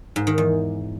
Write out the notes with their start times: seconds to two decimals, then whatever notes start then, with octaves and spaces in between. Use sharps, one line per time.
0.16 G#2
0.27 D#3
0.38 E2